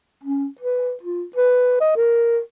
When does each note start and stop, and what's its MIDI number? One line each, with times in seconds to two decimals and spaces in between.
0.24 0.46 61
0.61 0.93 71
1.03 1.24 65
1.36 1.76 71
1.81 1.92 75
1.96 2.39 70